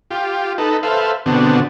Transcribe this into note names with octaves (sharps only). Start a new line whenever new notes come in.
F4 G4
D#4 A4 B4
A4 B4 C5 E5 F5
B2 D3 B3 C4 D4 F#4